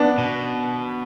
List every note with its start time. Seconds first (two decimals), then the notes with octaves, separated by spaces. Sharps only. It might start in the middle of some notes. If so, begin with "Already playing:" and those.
Already playing: B3 D4
0.18 B2